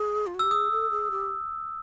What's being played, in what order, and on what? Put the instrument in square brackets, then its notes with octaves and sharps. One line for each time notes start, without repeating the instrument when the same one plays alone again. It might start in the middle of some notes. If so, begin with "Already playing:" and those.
Already playing: [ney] G#4
F4
F#4
[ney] G4 [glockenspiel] E6
[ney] G#4 [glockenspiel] D#6
[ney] A4
G#4
G4